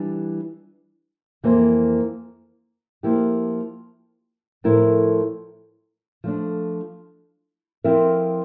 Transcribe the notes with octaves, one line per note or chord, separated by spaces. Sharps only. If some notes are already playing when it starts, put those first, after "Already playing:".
Already playing: E3 G3 D4
F2 E3 A#3 F4 C5
F3 A#3 E4 G4
A2 F3 A3 E4 A#4
F3 A3 D4
F3 C4 E4 A#4 E5